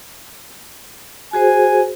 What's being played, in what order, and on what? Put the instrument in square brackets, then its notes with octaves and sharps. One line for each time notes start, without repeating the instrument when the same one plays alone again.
[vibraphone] F#4 G#4 C5 [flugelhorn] G#5